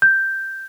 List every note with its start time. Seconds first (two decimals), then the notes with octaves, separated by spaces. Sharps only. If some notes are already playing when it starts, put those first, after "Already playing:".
0.02 G6